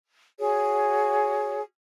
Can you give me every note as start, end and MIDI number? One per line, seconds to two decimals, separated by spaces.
0.40 1.61 66
0.40 1.61 68
0.40 1.61 73